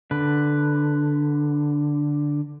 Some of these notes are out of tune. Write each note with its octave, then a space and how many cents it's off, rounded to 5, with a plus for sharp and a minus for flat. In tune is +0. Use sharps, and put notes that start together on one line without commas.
D3 +0 B4 +0